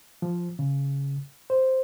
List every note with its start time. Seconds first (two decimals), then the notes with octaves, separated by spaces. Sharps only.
0.22 F3
0.59 C#3
1.50 C5